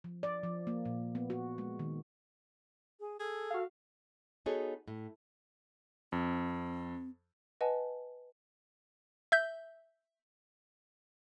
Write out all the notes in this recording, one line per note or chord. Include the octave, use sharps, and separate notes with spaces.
F3
D5
F3
A#3
A#2
B3
F#4
G#3
D#3
G#4
G#4 A4
F#4 F5
B3 D#4 F#4 G#4 A4 C#5
A2
F2 C4
B4 D#5 F#5 G#5 A5
E5 G6